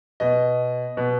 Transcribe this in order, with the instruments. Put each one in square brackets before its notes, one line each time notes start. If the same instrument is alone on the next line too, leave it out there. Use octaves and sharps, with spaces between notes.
[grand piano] B2 D#5
B2